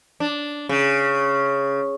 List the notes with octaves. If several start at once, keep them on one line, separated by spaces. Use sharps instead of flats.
D4
C#3